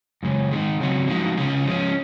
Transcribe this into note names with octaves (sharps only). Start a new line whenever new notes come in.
F#2 C#3 G#3
D#3 G#3 D#4
C#3 F#3 C4 F#4
F3 G#3 D#4 F#4
C#3 G#3 C#4 F4 G#4
F3 G#3 C#4